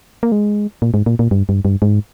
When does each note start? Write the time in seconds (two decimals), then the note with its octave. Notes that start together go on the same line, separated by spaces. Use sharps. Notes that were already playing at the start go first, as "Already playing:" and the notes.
0.23 A#3
0.32 G#3
0.82 A#2
0.94 G#2
1.06 A#2
1.19 A#2
1.31 G2
1.49 G2
1.65 G2
1.82 G#2